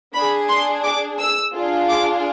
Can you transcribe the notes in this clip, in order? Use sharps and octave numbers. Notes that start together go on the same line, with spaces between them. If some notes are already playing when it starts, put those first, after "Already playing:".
D4 G#4 B5
C6
D6
E6
D4 F4 G#4
D6